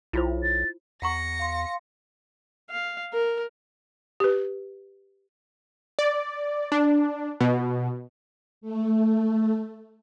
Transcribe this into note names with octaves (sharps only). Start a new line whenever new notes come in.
B1 E4 F4 C5
A6
E2 F#5 A#5 C#6 A#6 C#7
F5 C6
F5
A#4
G4 B4
D5
D4
B2
A3